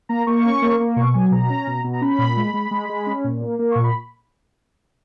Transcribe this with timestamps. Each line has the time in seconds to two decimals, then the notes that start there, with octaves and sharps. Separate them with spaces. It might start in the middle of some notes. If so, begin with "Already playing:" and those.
0.09 A#3 A#5
0.27 A#3 C#6
0.45 C#4
0.62 A#3
0.80 A#3
0.96 B2 C#6
1.14 F#3 G#5
1.31 B2 A#5
1.50 C#4
1.67 B2
1.84 B2
1.93 A#5
2.01 C#4 B5
2.18 A#2
2.37 G#3
2.54 G#3
2.71 G#3
2.89 G#3
3.07 C#4
3.24 A#2
3.41 A#3
3.59 A#3
3.72 A#2 C#6
3.84 B5